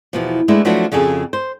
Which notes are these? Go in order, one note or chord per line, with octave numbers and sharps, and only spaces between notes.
E2 B2 F3
G#3 A3 B3 D4 E4
F3 F#3 A3 B3 D4 F#4
F2 C#3 F#4 G#4 A4
C5